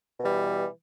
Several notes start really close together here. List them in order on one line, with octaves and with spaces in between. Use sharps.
B2 E3 G3